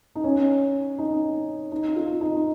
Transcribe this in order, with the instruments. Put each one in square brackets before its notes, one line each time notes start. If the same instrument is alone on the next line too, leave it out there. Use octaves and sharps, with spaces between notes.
[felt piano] D#4
C#4
D#4
D#4
F4
D#4